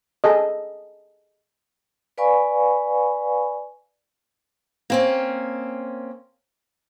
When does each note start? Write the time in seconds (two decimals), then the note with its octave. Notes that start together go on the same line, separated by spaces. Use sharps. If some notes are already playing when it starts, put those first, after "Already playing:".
0.24 G#4 A4 D#5
2.18 B4 D5 F5 G#5 B5 C#6
4.90 A#3 C4 C#4